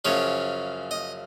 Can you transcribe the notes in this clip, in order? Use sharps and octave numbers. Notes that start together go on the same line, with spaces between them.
F#2 C#3 F3 C#5
D#5